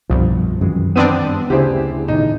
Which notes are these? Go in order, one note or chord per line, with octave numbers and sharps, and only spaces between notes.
C2 G2 B2 F3
F#2 D#3 E3 G#3
B3 C4 D4 D#7
G2
D2 C#3 E4 G4 G#4 C5
A1 A2 D#3 D#4